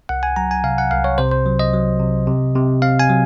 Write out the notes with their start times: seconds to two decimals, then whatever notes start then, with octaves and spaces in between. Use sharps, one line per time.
0.09 C2 F#5
0.23 G#5
0.36 F#3 A#5
0.51 G#5
0.64 C3 F5
0.78 F#5
0.91 C2 F5
1.04 C#5
1.18 C3 C5
1.32 C5
1.46 F#3
1.59 D#5
1.74 F#3
2.00 C3
2.27 C3
2.55 C3
2.82 C4 F5
2.99 G#5
3.09 F#3